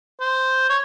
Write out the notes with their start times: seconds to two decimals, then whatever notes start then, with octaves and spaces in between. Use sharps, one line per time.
0.20 C5
0.69 C#5